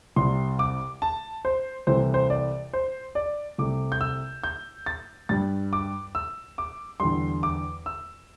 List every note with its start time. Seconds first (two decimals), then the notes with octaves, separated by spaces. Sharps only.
0.16 C2 C3 G3 C6
0.59 D6
1.02 A5
1.45 C5
1.87 C2 C3 E3 A3 C5
2.14 C5
2.30 D5
2.73 C5
3.15 D5
3.58 C2 C3 A3 D6
3.92 G6
4.01 E6
4.44 G6
4.86 A6
5.29 G2 G3 A6
5.73 D6
6.15 E6
6.58 D6
7.00 E2 D3 G3 C6
7.43 D6
7.86 E6